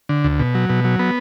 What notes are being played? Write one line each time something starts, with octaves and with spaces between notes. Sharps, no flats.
D3
D2
B2
F#3
B2
F#3
B3